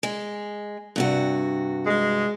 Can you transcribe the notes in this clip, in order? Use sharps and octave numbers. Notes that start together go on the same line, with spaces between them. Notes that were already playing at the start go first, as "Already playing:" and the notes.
G#3
G2 C3 F#4
G#3